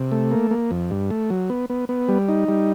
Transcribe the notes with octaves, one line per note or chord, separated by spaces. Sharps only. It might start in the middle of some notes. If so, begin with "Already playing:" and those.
Already playing: C3
A3
A#3
A#3
F2
G2
A3
F#3
B3
B3
B3
G3
D#4
G3